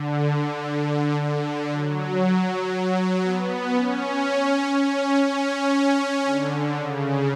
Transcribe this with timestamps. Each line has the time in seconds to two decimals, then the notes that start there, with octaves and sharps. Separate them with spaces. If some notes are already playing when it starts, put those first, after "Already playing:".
Already playing: D3
1.20 D3
1.71 F#3
3.23 B3
3.72 C#4
4.73 C#4
5.24 C#4
6.25 D3
6.75 C#3